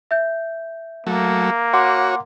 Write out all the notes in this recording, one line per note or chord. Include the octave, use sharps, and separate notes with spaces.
E5 G6
F#3 A3 A#3
F#4 C#5 F#5 C6 D6